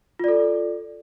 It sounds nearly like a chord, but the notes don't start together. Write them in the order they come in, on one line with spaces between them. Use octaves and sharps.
F4 D5 A4